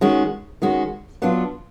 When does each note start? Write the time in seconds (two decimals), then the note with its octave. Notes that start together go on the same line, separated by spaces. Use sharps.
0.01 D#3 G#3 C#4 F#4
0.62 D#3 G#3 C#4 F#4
1.22 F#3 B3 D4 F4